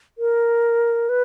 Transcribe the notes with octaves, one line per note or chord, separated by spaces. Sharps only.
A#4
B4